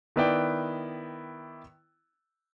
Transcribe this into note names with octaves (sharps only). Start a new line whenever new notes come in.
D#3 B3 E4 B4 D5 G5